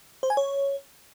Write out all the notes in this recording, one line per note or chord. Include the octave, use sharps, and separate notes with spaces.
C5
G#5
C#5